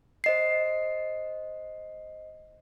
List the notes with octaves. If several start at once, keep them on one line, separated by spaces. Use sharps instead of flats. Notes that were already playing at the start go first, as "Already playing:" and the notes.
C5 D#5 C7